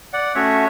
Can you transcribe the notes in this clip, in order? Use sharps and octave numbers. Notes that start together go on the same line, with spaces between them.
D5 F#5
A3 C#4 F#4 C#5 E5